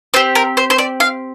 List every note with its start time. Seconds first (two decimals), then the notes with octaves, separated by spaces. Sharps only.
0.14 C4 G4 C5
0.35 A#4
0.57 C5
0.70 C5
0.78 D5
1.00 F5